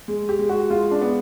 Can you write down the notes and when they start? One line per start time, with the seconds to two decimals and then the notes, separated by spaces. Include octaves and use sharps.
0.08 G#3
0.29 G4
0.39 G#3
0.49 F#4
0.70 G#3 F4
0.91 D4
1.01 B3